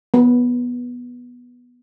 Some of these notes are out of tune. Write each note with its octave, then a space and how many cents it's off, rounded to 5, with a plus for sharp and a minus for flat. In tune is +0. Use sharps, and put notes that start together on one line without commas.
B3 -10